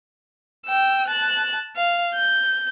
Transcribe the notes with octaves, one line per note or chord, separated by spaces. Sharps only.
G5 E6
A5 F#6
F5
G6